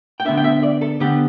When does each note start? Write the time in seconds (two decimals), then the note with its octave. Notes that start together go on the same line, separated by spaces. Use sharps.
0.20 G5
0.25 D3 B3 D4 E5
0.37 G5
0.44 E5
0.63 D5
0.81 A4
1.00 D3 B3 D4 G4